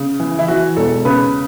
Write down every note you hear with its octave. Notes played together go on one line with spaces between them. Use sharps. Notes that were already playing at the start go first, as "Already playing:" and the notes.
Already playing: C#3
E3
E4
E3 F#4
E1 A4
C#3 B4